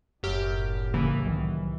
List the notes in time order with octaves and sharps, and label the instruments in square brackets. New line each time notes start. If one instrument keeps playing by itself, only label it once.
[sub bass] F#1 [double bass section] B1 A2 G3 [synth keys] F#2 G4 F6
[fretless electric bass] C#3 A#3 [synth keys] E3
[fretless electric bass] C2 D#3 [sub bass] F#3